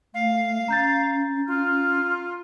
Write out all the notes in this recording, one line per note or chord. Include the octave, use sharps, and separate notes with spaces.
A3 F5
C#4 A#5 G6 A6
F4 F6